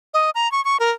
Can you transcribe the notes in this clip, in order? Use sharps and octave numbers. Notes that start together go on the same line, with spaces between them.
D#5
A#5
C#6
C#6
A#4